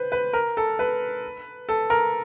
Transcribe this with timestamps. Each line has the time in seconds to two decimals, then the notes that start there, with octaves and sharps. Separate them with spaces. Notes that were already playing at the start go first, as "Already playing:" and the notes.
Already playing: B4 C5
0.12 B4
0.33 A#4
0.57 A4
0.79 B4
1.69 A4
1.90 A#4